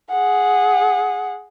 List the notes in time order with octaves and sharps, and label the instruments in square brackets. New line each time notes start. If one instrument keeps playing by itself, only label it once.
[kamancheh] G#4 F#5